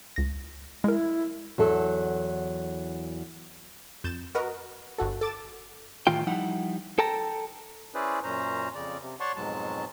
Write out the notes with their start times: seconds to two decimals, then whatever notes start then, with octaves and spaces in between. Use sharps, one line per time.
0.16 C#2 A#6
0.84 G#3 E4 A#4
1.58 E2 F#3 A4
4.04 F2 G6 A6 E7
4.35 F#4 A#4 B4 D#5
4.98 G1 F#4 A4
5.21 A4 D6 A6 E7
6.07 A2 D#3 E3 F4 G5
6.27 F3 G3 D#4 E4 F#5
6.99 A4 G5 A5 A#5
7.95 C#4 E4 G#4 B4 C5 D5
8.24 F#2 A#2 C#4 C5 A#5
8.75 F2 C#3 D5
9.01 C3
9.20 C#5 D5 F#5 A5 C6 C#6
9.36 F2 G#2 B2 F#3 G#3 A5